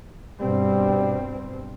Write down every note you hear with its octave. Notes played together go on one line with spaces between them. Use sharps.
G2 B2 G3 C4